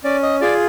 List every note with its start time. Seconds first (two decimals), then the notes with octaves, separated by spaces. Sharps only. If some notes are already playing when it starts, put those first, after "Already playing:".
0.04 C#4 D5
0.23 D#5
0.41 F4 G#4 D5